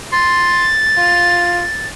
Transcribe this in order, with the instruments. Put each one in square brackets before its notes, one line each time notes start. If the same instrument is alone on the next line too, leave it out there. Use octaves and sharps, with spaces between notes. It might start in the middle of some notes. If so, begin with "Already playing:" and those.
[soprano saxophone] C6 [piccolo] A6
[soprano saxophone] F4